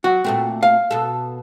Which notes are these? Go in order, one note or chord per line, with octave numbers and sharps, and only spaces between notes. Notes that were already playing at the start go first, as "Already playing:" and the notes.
F#3 F#4
A#2 A3 C4
F5
B2 A4